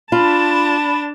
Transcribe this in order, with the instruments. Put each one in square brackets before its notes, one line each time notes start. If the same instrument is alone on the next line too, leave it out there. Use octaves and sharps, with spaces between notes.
[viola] D4 A5 [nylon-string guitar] F4 [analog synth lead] B5